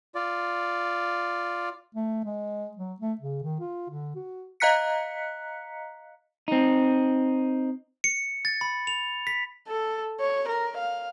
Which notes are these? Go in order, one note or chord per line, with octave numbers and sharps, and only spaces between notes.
F4 D5
A3
G#3
F#3
A3
C#3
D#3
F4
D3
F#4
D#5 F5 A#5 F#6 B6 C#7
C4 D#4
C#7
A6
B5
F7
B6
A4
C#5
A#4
F5